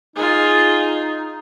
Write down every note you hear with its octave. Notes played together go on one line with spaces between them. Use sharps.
D#4 F4 G#4